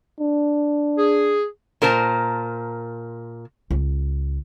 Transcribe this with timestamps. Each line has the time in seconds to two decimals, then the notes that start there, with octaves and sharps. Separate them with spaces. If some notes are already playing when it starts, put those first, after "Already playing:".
0.20 D4
0.97 G#4
1.82 A#2 A#4 C5 A5 A#5
3.71 C#2